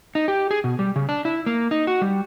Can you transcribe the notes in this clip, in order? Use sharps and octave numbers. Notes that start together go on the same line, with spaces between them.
D#4
G4
G#4
B2
G3
C#3
D4
E4
A#3
D#4
F#4
G3